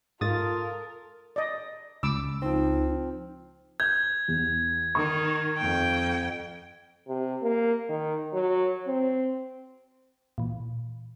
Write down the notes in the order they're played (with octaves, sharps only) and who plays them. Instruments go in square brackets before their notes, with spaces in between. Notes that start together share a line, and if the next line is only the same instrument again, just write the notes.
[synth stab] G#2 [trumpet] F4 [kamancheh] A4 A#4 [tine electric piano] D#6 A6
[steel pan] D5 D#5
[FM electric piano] C#2 [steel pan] B5 D6 E6
[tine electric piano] F3 C4 [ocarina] D#4
[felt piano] G6 [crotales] G#6
[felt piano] E2
[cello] D#3 [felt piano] C#6 D#6
[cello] F2 G5
[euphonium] C3
A#3
D#3
F#3
C4
[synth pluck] A#2 E3